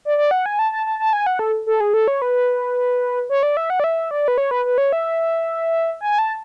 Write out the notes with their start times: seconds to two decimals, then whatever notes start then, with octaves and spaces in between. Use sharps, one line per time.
0.05 D5
0.18 D5
0.31 F#5
0.46 G#5
0.59 A5
0.72 A5
0.86 A5
0.99 A5
1.13 G#5
1.26 F#5
1.39 A4
1.66 A4
1.80 G#4
1.94 A4
2.08 C#5
2.22 B4
3.30 C#5
3.43 D5
3.57 E5
3.70 F#5
3.80 D5
3.84 E5
4.11 D5
4.28 B4
4.38 C#5
4.51 B4
4.65 B4
4.78 C#5
4.92 E5
6.01 G#5
6.19 A5